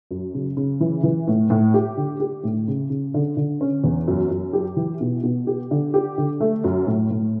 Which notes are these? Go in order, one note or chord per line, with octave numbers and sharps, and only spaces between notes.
F#2
C#3
C#3
E3
E3
A2
A2
G4
D3
G4
A2
C#3
C#3
D3
D3
C#4
E2
F#2
F#2
G4
E3
B2
B2
G4
D3
G4
D3
A3
F#2
A2
A2